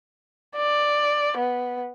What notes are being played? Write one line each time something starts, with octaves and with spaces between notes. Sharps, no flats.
D5
B3